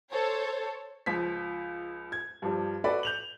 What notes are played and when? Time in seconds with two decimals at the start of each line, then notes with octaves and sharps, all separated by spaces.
0.10 A4 C5 C#5
1.06 C#2 F3 B6
2.12 G#6
2.42 G2 F3 G3
2.84 F#4 A4 B4 D5 B5
3.03 G6 F7 F#7